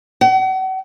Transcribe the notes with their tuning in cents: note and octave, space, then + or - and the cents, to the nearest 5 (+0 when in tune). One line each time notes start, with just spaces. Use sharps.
F#5 +40